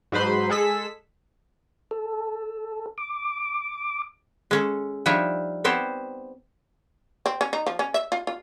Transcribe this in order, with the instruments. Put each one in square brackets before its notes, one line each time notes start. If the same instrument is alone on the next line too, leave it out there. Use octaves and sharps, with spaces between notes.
[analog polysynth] G#2 F#3 B4 C5 B5 C6
G#3 G#4 A4 E6 B6
[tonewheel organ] A4
D6
[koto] G#3 C#4 A4
F3 G3 D4 D#4 C#5 E5
B3 C4 G4 C5 C#5 A5
[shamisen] C4
C#4
D#4
F3
C#4
E5
F4
F4